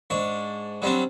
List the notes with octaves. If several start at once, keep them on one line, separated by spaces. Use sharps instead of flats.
G#2 D4 C#6
F#3 G3 C4 D4